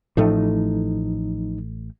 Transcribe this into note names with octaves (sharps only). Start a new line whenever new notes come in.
A1 A2 F3 A3 D#4